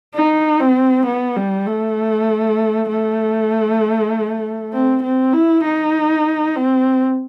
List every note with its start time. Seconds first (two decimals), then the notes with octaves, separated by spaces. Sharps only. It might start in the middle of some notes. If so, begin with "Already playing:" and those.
0.15 D#4
0.60 C4
1.06 B3
1.36 G3
1.67 A3
2.89 A3
4.73 C4
5.03 C4
5.33 E4
5.64 D#4
6.56 C4